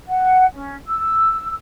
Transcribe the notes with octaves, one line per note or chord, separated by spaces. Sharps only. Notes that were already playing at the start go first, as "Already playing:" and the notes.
F#5
C#4
E6